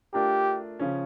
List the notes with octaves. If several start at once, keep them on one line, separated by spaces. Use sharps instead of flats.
A3 D4 F4 G4 A#4
C#3 F3 C#4